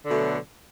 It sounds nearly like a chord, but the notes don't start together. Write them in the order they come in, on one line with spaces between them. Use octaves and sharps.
D3 B2 A3 F#3